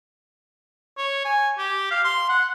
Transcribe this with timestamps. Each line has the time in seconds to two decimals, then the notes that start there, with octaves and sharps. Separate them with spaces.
0.97 C#5
1.25 G#5
1.58 G4
1.91 F5
2.04 C6
2.29 F#5